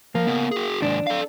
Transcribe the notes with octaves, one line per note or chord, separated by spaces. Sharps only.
F3 A#3
C#3 B3
F#4 G#4
D#2 G#2 D4
A4 F5